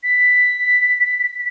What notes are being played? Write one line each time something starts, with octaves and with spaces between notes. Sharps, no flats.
B6